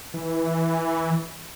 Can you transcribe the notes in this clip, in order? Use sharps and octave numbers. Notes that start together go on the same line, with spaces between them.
E3